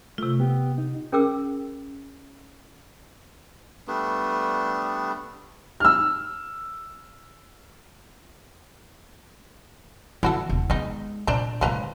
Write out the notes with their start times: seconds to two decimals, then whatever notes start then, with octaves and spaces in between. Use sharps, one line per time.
0.18 C3 A3 F4
0.40 B3 G4
0.78 D#4
1.12 C#4 G#4 A#4 G5 D6 E6
3.88 G3 A3 B3 D4
5.80 E6 F6
10.23 E3 E4 F#4 A4
10.49 E1
10.70 G#3 B3 D#4
11.27 A#2 D4 C5 A#5
11.61 D3 F3 G#3 B4 A#5